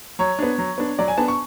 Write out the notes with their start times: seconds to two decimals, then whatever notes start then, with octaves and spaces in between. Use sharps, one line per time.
0.19 F#3 C#5
0.39 B3 D4
0.58 F#3
0.78 B3 D4
0.99 F#3 D5
1.08 G#5
1.18 B3 D4 A5
1.28 C#6